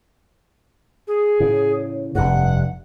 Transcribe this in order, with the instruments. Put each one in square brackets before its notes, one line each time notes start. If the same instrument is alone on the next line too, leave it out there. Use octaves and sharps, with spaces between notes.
[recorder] G#4
[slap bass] A2 C#3
[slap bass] F1 G2 [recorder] F#5